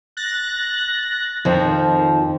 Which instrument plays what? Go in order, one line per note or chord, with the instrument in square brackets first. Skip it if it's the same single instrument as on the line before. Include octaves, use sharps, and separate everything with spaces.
[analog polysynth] F#6 A6 A#6
[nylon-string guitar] F2 F3 [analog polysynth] D#3